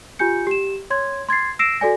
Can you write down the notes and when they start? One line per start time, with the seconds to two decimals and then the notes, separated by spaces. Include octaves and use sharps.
0.19 F4 G4 G#5 G6 C#7
0.47 G4 E7
0.90 C#5 C6 G#6
1.29 C6 G#6 A6 C7
1.59 E6 A#6 C7 D7 E7
1.80 F#4 A4 D5 G#5 A#6